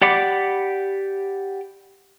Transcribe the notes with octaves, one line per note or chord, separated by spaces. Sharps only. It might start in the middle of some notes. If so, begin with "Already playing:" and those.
G4 D5 F#5 B5 D6